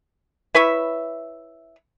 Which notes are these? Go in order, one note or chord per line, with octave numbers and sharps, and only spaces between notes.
E4 B4 C#5 E5